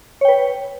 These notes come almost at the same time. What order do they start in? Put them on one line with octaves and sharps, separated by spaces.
C#5 G5 B4